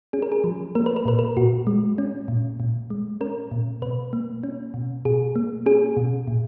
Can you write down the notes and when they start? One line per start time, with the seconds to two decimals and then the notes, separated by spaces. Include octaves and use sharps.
0.13 C#4 G#4
0.22 A#4
0.32 G#4
0.44 F3
0.75 A#3 A#4
0.86 B4
0.96 A#4
1.05 A#2 B4
1.19 A#4
1.37 A#2 F#4
1.67 G#3
1.98 C#4
2.28 A#2
2.60 A#2
2.90 G#3
3.21 C#4 A#4
3.51 A#2
3.82 B2 B4
4.13 A#3
4.43 C#4
4.74 B2
5.05 B2 G#4
5.36 A#3
5.66 C#4 G#4
5.97 B2
6.28 A#2